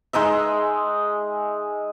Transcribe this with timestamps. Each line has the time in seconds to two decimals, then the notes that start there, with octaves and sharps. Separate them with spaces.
0.13 G#3 D#4 D#5 E5